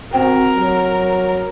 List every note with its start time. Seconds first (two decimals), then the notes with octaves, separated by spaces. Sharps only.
0.13 C4 F#4 A#4 C5 G5
0.56 F#3